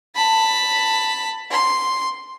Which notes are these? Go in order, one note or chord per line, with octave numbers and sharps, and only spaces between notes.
A5 B5
C6